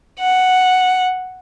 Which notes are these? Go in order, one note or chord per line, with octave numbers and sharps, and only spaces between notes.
F#5